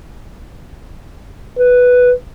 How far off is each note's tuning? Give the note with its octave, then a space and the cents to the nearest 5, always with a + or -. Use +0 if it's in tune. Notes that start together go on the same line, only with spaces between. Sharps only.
B4 +0